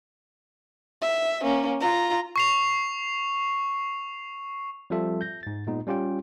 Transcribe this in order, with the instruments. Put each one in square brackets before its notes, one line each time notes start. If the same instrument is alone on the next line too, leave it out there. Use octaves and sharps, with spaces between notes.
[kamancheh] E5
A#3 C#4
F4 A#5
[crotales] C#6 C7 F7
[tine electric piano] F3 G3 C4 F4 A4 E5
G6 A#6
G#2 A6
A#2 G#3 B3 D#4
G3 C#4 F4 G4 G5